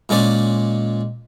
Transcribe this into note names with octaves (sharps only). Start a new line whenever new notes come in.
A#2 G#3 C#4 D5